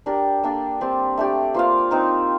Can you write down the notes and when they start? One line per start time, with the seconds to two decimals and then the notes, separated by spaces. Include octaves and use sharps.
0.06 D4 G4 A#4 D5
0.43 A#3 D4 A4
0.81 G3 C4 G4
1.18 A3 D4 G4
1.54 A#3 F4 C5 F5
1.91 C4 D#4 A#4